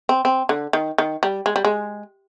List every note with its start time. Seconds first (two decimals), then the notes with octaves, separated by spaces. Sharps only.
0.09 C4
0.25 C4
0.49 D3
0.73 D#3
0.98 D#3
1.23 G3
1.46 G#3
1.56 G3
1.65 G#3